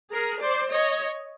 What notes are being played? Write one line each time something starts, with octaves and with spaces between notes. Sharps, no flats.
G#4 A#4
C5 D5
C#5 D#5